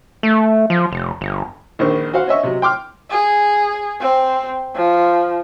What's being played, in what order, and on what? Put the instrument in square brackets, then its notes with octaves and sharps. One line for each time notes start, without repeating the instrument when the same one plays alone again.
[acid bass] A3
F3
F1
G1
[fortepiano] A#1 D#3 C4 C#6
F#4 C5 F5 F#5
C#4 D#5 E5 C#6
C3 F#3 D#5
G5 C6 D6 F6
[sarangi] G#4
C4
F3